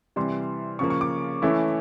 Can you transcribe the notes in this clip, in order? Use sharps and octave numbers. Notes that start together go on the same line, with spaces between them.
C3 E3 G3 C6
C#3 F3 A#3 C#6
C#6
D6
E3 A3 C#4 E4